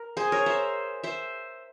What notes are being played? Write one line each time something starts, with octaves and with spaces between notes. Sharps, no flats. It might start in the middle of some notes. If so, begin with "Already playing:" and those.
Already playing: A#4
G#4 C5
A#4 C#5
C5 E5
C5 E5